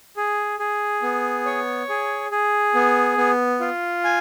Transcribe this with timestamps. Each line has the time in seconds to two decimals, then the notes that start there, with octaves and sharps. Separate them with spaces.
0.17 G#4
0.59 G#4
1.02 B3
1.46 C#5
1.89 G#4
2.31 G#4
2.75 B3
3.18 B3
3.60 F4
4.04 G#5